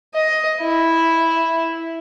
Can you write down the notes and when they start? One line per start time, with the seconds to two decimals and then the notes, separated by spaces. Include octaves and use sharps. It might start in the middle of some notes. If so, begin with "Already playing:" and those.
0.15 D#5
0.62 E4